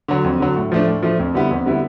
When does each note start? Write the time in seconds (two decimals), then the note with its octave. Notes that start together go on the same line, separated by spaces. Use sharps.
0.08 D3 F#3
0.24 F2
0.40 D3 F#3
0.56 A2
0.72 F3 A3 D4
0.87 A2
1.03 F3 A3 D4
1.19 F2
1.34 D3 G3 B3 E4
1.51 F2
1.66 D3 G3 B3 E4